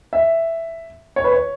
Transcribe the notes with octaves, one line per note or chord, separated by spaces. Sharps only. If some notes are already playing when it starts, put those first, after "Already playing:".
E5
C#5
B4
C#5